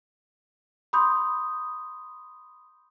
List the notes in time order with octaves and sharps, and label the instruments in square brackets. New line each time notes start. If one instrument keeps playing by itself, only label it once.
[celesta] B5 C6 D#6 G6